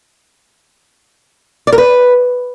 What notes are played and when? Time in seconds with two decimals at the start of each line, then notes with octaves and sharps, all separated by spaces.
1.67 D5
1.73 A#4
1.78 B4